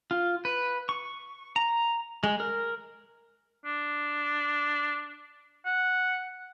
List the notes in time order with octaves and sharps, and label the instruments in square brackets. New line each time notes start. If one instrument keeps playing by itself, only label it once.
[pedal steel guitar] F4
B4
C#6
A#5
G#3
A#4
[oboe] D4
F#5